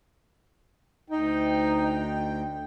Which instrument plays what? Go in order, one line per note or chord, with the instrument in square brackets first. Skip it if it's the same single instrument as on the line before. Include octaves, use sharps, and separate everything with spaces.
[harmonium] D2 G5 [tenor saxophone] D#4